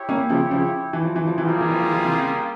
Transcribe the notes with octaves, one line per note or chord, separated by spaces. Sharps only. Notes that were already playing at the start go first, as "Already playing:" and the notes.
Already playing: E4 G4 C#5 G5
A#3 C#4
C#3 F3
C#3 F3
E3
F3
E3
F3
E3 G3 A#3 F4 G#4
F3
E3
F3
E3
F3
C3 E3
C#3